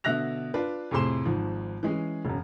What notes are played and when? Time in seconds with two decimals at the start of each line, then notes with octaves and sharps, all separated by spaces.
0.04 B2 D3 E5 F#6 A#6 F7
0.54 D4 F4 B4
0.91 F2 A2 C3 G#4 C6 E7
1.25 G#1 G#2 F3
1.83 E3 G#3 C#4 G#4
2.25 E1 F#2